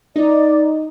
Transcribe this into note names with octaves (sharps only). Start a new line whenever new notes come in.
D#4 D5